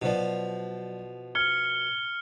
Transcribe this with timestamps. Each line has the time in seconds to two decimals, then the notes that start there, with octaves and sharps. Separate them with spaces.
0.02 B2 F3 F#3 C5 D5
1.35 F6 G#6 C#7 G7